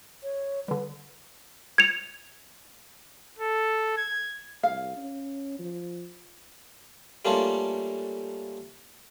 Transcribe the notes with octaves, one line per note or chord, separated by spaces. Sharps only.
C#5
D3 G3 B4
G#6 C#7 F7
A4
G#6
C2 F5
C#4
F3
G3 A3 A#3 C#4 D4 F4